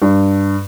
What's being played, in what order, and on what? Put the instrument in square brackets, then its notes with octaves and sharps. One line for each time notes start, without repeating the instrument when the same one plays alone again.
[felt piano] G2